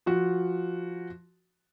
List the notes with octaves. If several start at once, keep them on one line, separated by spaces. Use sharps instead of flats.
F3 F#4